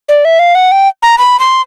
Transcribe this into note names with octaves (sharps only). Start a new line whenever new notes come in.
D5
E5
F5
F#5
G5
A#5
B5
C6